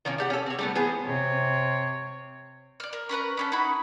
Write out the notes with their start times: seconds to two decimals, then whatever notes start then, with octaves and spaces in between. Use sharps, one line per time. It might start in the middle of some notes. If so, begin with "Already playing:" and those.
0.05 D#3 F3 A#3 C#4
0.18 D4 G4 F#5
0.30 C#4 A4
0.46 C4 C#5
0.59 G3 A3 B3
0.75 E3 B3 G#4 C5
1.06 C3 C#5
2.80 D5 F6
2.93 A#4
3.09 C#4 A#4 B4 A#5
3.37 B3 C#4 A4
3.52 D#4 E4 F#4 B5